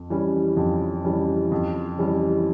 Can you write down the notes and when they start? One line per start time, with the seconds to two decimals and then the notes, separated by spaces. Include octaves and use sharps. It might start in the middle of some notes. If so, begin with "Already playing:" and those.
Already playing: F2
0.10 E3 G3 C#4
0.57 F2
1.04 E3 G3 C#4
1.52 F2
1.99 E3 G3 C#4